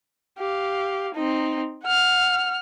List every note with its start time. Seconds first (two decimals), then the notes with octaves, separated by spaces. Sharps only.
0.39 G4 F5
1.14 C4 D#4
1.84 F#5 F6